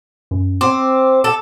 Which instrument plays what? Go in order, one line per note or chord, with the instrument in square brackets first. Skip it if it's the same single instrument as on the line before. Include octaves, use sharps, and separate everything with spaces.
[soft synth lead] F#2
[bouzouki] C4 [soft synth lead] D6
[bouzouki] A4